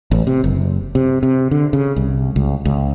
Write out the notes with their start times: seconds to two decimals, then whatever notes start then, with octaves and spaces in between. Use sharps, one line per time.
0.11 A1
0.27 C3
0.44 F#1
0.95 C3
1.23 C3
1.51 D3
1.73 C#3
1.96 C2
2.36 C#2
2.65 C#2